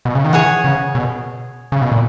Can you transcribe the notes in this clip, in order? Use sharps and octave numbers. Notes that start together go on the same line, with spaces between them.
B2
C#3
D#3
E3 G#4 C#5 F#5
C#3
B2
C#3
B2
A#2